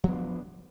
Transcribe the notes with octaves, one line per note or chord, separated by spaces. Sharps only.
F3 B3 D4